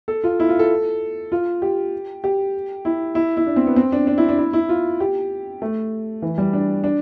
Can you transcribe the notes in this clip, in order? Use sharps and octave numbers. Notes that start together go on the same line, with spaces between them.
A4
F4
E4
F4
A4
F4
G4
G4
E4
E4
E4
D4
C4
B3
C4
D4
D4
E4
D4
E4
E4
F4
G4
A3
E3
G3
D4
D4